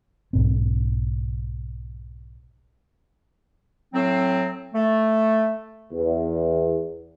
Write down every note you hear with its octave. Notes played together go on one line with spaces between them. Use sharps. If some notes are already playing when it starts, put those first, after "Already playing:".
B1 G#2 C4
A2 F#3 C4
A3
E2